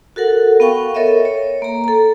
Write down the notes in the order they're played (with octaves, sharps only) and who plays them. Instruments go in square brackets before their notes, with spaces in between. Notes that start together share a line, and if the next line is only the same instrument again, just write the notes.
[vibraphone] F#4 A4 A#4 F#5
B3 F5 G5 C#6
A4 A#4 C#5 D#5 E5
C#5
A#3 A#5
A4 A#5